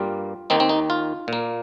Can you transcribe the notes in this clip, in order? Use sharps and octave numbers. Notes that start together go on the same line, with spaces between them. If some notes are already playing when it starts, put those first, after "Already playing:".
Already playing: G2 G3 A#3 F4
D#2 D#3 C4 D#4
C4
D#4
F4
A#2 A#3